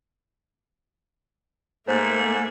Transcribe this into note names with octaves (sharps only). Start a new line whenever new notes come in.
G#2 A3 A#3 C5